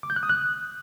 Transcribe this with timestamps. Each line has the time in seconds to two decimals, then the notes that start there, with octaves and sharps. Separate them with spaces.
0.03 D6
0.10 G6
0.16 F#6
0.23 D#6
0.29 F#6